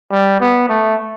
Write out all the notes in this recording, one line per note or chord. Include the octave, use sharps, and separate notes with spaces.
G3
B3
A3